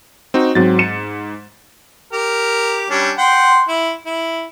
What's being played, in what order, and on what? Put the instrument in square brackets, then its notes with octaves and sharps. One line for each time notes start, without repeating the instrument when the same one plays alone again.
[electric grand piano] C4 D#4 F#4
[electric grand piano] G#2 A6 [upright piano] F#3 C4
[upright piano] C#7 E7
[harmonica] G4 A#4
G3 C#4 D4
F#5 G5 C6
E4
E4